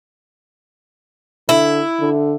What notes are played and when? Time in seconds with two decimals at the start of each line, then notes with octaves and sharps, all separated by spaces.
1.49 D3 E4
2.00 D3